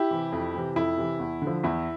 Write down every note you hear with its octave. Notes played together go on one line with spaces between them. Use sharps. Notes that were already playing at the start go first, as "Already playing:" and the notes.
Already playing: E4 G4
C3 E3
F2
C3 E3
F2 E4
C3 E3
E2
D3
F3
E2 E4